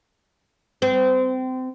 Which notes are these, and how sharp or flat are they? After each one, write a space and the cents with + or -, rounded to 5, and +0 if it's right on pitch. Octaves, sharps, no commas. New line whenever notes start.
C4 -25